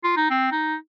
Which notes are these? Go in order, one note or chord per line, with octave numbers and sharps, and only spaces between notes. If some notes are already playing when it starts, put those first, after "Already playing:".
F4
D#4
C4
D#4